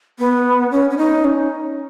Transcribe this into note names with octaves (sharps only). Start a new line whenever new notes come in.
B3
C#4
C#4
D#4
C#4